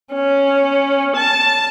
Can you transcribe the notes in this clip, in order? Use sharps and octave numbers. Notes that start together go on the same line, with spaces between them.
C#4
A5